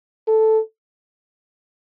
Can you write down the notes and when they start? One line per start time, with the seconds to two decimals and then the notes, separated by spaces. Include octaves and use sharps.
0.28 A4